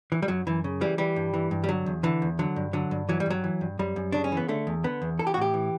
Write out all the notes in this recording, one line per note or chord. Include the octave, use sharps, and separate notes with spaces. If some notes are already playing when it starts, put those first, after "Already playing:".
E3
G3
F#2 F#3
F#2 E3
C#3
E3 G3
E3 G3
G2
E3
G2
G3
D3 F#3
E2
D3 E3
E2
D3 F#3
G2
D3 F#3
G2
E3 F#3
G3
G2 F#3
E3
G2
F#2 G3
F#2
C#3 D4
C#4
E3 B3
D3 A3
E2
D3 B3
E2
E3 A4
G4
F#4
A2 G4
E3